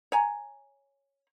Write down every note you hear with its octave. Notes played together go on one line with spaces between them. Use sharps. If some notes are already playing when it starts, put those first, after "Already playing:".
C#5 G#5 A#5